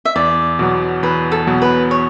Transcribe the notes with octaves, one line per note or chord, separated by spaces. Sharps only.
E5
E2 D5
B2 F#3 B3
E2 B4
A4
B2 F#3 B3
B4
C#5